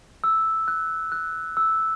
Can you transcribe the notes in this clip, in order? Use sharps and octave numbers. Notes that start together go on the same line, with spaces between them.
E6
F#6
F#6
E6